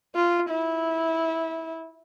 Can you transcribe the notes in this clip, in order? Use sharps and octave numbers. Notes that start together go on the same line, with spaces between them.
F4
E4